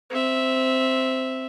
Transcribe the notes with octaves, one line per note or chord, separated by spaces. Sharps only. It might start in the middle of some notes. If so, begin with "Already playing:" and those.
C4 E5